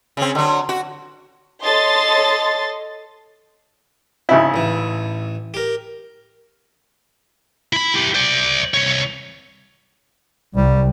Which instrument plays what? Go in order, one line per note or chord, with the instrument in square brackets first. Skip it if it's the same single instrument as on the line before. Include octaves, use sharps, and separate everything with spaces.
[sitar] C#3 C4
D3 F#3
F#4
[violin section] A4 C#5 D#5 C6 A6
[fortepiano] G#1 C#3 E4
[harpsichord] A1 E3
G4 A#4
[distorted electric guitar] E4 B5
E4 G4
C5 D5
C2 C#5
[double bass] C2 [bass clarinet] G3